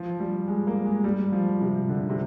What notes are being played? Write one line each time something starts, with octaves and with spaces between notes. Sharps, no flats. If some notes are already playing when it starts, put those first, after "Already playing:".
Already playing: F3
G3
G#3
A#3
G#3
G3
F3
C3
D3
C3